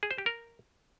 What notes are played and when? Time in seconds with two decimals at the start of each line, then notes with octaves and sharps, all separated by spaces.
0.03 G#4
0.11 C5
0.18 G4
0.26 A#4